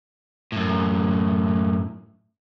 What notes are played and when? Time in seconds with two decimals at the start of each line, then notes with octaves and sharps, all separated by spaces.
0.52 F#2 A2